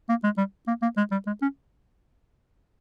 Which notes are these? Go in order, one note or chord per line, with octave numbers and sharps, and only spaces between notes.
A#3
G#3
G3
A#3
A#3
G#3
G3
G#3
C#4